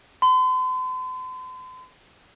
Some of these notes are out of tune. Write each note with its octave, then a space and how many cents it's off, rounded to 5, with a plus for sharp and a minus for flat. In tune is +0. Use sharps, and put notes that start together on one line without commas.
C6 -45